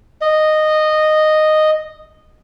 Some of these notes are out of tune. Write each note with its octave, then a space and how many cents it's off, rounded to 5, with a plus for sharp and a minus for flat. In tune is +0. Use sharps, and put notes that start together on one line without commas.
D#5 -10